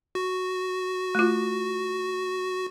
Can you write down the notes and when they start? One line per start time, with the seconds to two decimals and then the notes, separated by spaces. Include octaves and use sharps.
0.15 F#4
1.15 A3 F4